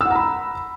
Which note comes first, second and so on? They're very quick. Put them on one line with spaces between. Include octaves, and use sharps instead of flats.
E6 F#5 A#5 B5